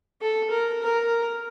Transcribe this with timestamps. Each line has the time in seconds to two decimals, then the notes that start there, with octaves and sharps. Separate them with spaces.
0.21 A4
0.50 A#4
0.82 A#4